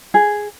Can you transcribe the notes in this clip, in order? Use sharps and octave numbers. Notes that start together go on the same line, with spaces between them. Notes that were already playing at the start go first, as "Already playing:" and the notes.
G#4